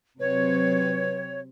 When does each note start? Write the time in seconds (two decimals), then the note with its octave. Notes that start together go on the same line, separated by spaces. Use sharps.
0.19 C3 F#3 C4 B4 C#5